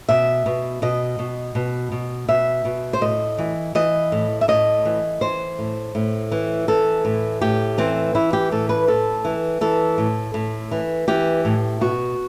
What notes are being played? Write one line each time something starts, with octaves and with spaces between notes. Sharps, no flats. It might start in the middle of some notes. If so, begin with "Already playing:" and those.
B2 E5
B2
B2 D#5
B2
B2
B2
B2 E5
B2
C5
A2 D#5
E3
E3 D#5
A2
E5
A2 D#5
E3
E3 C5
A2
A2
E3
E3 A4
A2
A2 G4
E3 C4
E3 E4
G4
A2 A4
B4
A2 A4
E3
E3 A4
A2
A2
E3
E3 G4
A2
B2 F#4